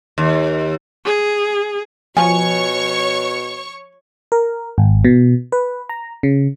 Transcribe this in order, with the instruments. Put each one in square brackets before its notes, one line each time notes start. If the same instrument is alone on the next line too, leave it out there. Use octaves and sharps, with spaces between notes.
[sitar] D#2
[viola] G#4
[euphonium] B2 [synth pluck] F3 [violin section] C#5 C#6 [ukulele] G#5
[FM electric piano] A#4
G#1
B2
B4
A#5
C#3